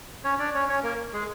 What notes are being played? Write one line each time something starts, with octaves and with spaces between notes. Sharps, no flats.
C#4 C#5
D4 D5
C#4 C#5
C#4 C#5
A#3 A#4
G#3 G#4